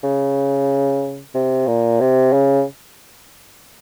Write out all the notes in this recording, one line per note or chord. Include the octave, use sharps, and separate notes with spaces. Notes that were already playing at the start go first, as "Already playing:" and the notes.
C#3
C3
A#2
C3
C#3